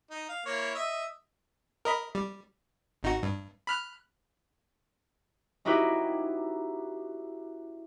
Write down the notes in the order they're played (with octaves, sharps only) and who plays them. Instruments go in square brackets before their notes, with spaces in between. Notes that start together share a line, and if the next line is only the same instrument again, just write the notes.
[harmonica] D#4
F5
A#3 E4 C#5
D#5 E5
[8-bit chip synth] A#4 D#5 B5
G3
G#1 D#4 F#4
G2
B5 F6 F#6
[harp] C#4 D#4 E4 F#4 G4 B4